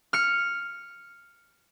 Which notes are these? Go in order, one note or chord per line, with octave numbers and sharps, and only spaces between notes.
F6 C#7